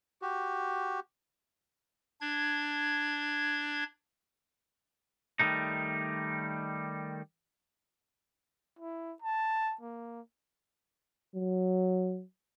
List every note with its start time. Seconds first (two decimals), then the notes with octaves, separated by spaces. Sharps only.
0.22 F#4 G4
2.21 D4 G#6
5.40 D#3 G3 A3 D#4
8.79 E4
9.22 A5
9.81 A#3
11.35 F#3